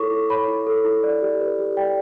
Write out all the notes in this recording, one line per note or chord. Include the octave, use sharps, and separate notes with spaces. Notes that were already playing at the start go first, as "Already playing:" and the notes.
Already playing: E4 A4 C#5 C#6 D6
E4
C#5 B5
E4
A4
E4
D5
G4
B4
G4
D5 G5